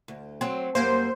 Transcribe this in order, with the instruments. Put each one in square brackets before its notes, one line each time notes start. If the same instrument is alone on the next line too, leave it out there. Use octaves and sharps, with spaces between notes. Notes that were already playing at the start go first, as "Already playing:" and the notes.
[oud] D2
F#3 C4
[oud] F#2 G3 A#3 [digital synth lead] C5